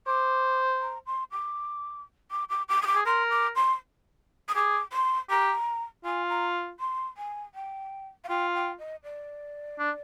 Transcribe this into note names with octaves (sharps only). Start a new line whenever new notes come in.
C5 D6
A#5
C6
D6
D6
D6
D6
D#6
D6
G#4
A#4 C6
D6
C6
D#6
G#4 D6
C6
G4 A#5
F4 G#5
A#5
C6
G#5
G5
F5
F4 G5
G5
D#5
D5
D4